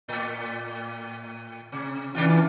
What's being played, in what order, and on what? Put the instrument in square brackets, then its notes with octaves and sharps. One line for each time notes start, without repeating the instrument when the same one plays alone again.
[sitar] A2
C3
[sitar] C3 D4 F4 [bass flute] E3